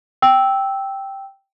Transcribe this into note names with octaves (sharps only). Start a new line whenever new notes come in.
G5 E6